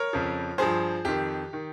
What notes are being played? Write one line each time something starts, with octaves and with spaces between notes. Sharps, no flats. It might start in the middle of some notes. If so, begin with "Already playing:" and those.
Already playing: A#4 C#5
F2 C#3 F3
G2 F3 G#4 C5
F2 D#3 G4
D#3